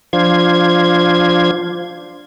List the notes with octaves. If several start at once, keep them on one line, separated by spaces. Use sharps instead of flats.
F3 D4 F4 C5 G#6